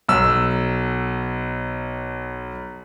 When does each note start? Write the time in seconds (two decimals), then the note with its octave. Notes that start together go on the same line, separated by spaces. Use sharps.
0.09 B1 E6